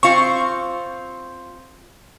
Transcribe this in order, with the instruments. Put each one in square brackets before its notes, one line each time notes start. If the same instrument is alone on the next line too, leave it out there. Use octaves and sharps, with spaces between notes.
[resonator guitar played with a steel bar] C4 F4 [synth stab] C#6